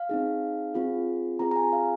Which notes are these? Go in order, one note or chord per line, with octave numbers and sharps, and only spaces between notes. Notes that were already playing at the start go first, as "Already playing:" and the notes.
Already playing: F5
C4 D#4 G#4
C4 F4 G#4
C4 F4 G#4 A#5
A#5
G#5
F5